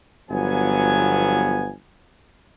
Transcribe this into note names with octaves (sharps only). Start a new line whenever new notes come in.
G1 F3 F#3 B3 G#5